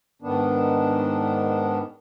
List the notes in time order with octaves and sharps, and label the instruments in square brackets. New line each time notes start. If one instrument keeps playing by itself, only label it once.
[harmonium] G#2 D#3 B3 D4